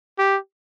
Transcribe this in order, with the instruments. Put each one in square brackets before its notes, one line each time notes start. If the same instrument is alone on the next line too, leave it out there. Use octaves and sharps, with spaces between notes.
[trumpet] G4